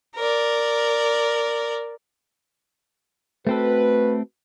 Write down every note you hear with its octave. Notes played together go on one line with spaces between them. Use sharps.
A#4 D5
A3 C4 F#4 A4 B4